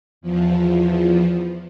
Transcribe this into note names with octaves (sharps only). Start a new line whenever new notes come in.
E2 F3